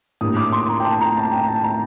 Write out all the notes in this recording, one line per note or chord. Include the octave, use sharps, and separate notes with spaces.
A2 G3 A#3 D4 D#6
D6
C6
A#5
G5
A5
A#5
A5
G5
A5
A#5